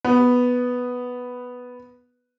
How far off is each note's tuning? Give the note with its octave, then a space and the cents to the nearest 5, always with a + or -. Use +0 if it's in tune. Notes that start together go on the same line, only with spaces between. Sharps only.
B3 +0 B4 +0